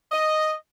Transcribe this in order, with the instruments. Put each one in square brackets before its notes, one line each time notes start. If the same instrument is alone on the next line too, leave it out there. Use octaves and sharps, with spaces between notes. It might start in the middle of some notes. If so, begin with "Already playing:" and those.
[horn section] D#5